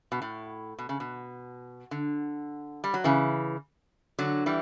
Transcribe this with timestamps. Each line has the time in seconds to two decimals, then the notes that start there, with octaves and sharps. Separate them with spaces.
0.12 B2
0.22 A2
0.78 B2
0.89 C#3
1.00 B2
1.91 D3
2.84 G3
2.94 F#3
3.04 C#3 E3
4.19 D3 F#3
4.46 E3 G3